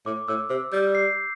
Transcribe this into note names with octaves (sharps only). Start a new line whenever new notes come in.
A2 D6
A2 E6
C3 E6
G3 G6
C7